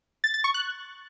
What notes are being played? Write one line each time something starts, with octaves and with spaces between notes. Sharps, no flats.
A6
A6
C#6
F#6